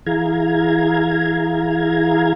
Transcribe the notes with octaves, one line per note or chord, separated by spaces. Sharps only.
E3 E4 G#4 F5 A#5 G#6